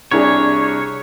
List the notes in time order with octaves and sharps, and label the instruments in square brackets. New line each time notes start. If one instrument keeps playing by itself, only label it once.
[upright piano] C2 D4 G#4 [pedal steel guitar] C#5